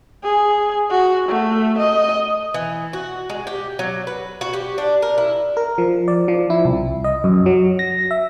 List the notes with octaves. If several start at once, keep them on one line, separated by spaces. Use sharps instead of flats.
G#4
F#4
A3
D#5
E3
F#4
G#3
G4
F#3
B4
F#4
G4
D4
A#4
E4
A#4
F3
D5
F3
E4
C2
D#5
F#2
F#3
A#6
E5